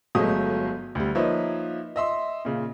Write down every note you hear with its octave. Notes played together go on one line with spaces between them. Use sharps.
G1 F#3 G#3 A3 D#6
D2 G3
F3 A#3 D#4 B4 C#5 E5
D#5 E5 C6
A#2 C#3